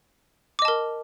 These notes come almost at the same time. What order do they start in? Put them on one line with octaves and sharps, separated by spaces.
D6 D#5 A5 A#4